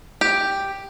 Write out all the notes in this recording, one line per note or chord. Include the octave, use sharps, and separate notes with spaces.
G4